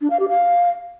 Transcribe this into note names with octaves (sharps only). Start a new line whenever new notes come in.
D4
F5
G4
F5